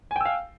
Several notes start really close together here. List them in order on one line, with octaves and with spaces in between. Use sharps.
G#5 G5 E6 F5